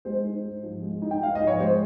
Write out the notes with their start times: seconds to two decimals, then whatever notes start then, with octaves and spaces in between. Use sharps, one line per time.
0.05 G#3 C5
0.24 D#4
0.44 G#2
0.63 F3
0.82 G#3
1.02 D#4
1.11 G5
1.21 G#2 F5
1.35 D#5
1.41 F3
1.47 C#5
1.60 G#3 C5